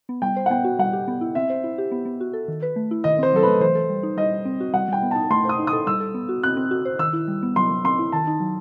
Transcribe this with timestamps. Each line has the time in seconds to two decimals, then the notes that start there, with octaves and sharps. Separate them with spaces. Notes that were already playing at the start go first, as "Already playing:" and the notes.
0.09 B3
0.22 G3 G5
0.36 C5
0.46 F#5
0.50 B3 G5
0.64 F#4
0.79 G3 F#5
0.93 G4
1.08 B3
1.21 E4
1.35 C4 E5
1.50 C5
1.64 E4
1.78 G4
1.91 B3
2.05 B3
2.21 F#4
2.33 A4
2.48 D#3
2.62 B4
2.76 A3
2.91 E4
3.04 D#3 D#5
3.19 C4 C5
3.33 F#3 A4
3.43 A3 B4
3.60 E3 C5
3.75 A4
3.90 G3
4.03 D#4
4.17 G3 D#5
4.31 G3
4.45 C4
4.60 F#4
4.73 G3 F#5
4.88 G3 G5
5.03 B3
5.11 D#4 A5
5.30 A3 C6
5.45 C5 D#6
5.59 D#4
5.67 D#6
5.73 A4
5.87 G3 E6
6.00 A4
6.14 B3
6.29 F#4
6.43 C4 F#6
6.57 C4
6.71 F#4
6.85 C5
6.99 D#3 E6
7.13 E4
7.28 G3
7.43 B3
7.56 F#3 C6
7.70 F#3
7.84 C4 C6
7.99 E4
8.12 D#3 A5
8.27 D#4
8.40 F#3